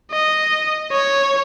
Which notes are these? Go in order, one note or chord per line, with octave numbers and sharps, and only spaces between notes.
D#5
C#5